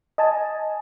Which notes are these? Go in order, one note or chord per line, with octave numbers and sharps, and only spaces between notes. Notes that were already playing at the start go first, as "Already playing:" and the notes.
D#5 G#5 A5